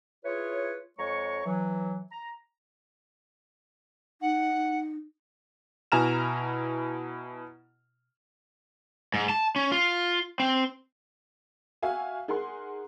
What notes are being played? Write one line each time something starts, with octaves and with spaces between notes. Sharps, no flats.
E4 F4 G#4 B4 C#5
F2 G#3 C#5 A#5 C#6
E3 F#3
A#5
D#4 F#5
B2 E4 G#5 A#5 F6 E7
G#2
A5
C#4
F4
C4
F#4 E5 F5 G#5
D#4 G#4 A#4 F#5 C6